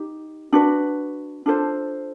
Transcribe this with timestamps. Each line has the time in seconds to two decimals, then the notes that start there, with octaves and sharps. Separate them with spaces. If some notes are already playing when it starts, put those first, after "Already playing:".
Already playing: D#4 G4
0.53 D4 F#4 B4
1.46 D4 F4 A4 C5